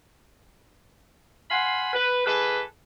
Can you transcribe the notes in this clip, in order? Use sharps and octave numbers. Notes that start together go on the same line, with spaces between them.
F5 F#5 G#5 B5 C6
B4
E3 G#4 A4 B4